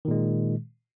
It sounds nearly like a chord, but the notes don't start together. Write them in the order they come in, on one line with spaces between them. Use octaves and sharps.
D#3 A#2 G#3